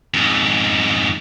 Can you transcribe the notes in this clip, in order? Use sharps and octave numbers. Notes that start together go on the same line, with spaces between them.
F2 G#2